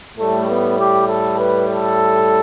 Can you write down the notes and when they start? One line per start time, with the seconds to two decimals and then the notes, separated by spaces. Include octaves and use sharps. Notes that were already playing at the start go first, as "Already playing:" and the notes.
0.17 A2 G3 A3
0.48 B3
0.78 G4
1.08 A4
1.38 B4
1.68 A4